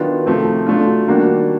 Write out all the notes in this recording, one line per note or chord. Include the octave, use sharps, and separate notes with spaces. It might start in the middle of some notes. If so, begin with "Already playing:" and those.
Already playing: D#3 F#3 B3 D4 F4
C3 F3 A3 C4
F#3 A3 D4 F4
D#3 G3 A#3 D4 F#4